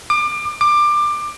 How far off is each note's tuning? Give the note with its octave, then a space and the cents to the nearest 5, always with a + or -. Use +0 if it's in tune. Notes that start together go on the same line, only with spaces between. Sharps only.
D6 +30
D6 +20